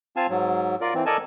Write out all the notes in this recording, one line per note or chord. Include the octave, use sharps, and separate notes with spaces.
C4 F4 F5 G#5 A5
G#2 F#3
F4 A#4 D5
E3 C4
A4 A#4 D5 D#5 G#5 A5